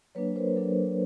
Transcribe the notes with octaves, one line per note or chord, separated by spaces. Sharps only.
F#3 A#3 D4 B4 C#5
A#4 C5
F#3 A#3 D4 A4 B4